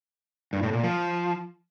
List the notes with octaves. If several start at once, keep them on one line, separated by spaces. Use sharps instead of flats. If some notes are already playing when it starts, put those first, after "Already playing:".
G2
A2
A#2
F3